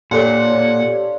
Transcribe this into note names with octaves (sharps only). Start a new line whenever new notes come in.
A#2 D4 G4 A4 C#5 F5 F#5 C6